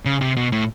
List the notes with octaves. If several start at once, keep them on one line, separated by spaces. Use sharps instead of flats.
C#3
C3
B2
A2